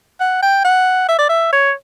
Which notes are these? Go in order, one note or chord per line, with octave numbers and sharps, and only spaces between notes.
F#5
G5
F#5
E5
D5
E5
C#5